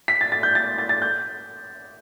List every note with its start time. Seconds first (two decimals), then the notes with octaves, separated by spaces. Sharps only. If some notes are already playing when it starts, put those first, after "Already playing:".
0.08 B6
0.21 A6
0.32 A6
0.43 G6
0.55 A6
0.78 A6
0.89 A6
1.02 G6